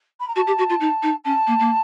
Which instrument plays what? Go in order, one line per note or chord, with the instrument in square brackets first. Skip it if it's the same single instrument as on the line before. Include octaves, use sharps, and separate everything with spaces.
[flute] B5
A#5
[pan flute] F#4 [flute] A5
[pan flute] G4
F#4
F4
D#4
D#4
[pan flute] C#4 [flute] A5
[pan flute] A#3
A#3